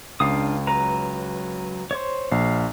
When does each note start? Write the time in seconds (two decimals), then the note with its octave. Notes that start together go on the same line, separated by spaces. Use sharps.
0.20 C#2 D4 F5 D#6
0.67 F#3 B4 A#5
1.91 C5 C#5
2.32 A#1 F5